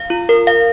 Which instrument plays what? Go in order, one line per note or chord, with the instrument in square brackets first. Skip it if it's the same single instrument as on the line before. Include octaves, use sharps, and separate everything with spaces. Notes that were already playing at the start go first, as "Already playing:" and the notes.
Already playing: [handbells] F5
F4
A#4
F5